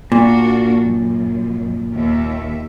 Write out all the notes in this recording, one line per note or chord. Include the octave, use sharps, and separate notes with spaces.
A#2 A#3 D4 F#4
F#2
D#2 E5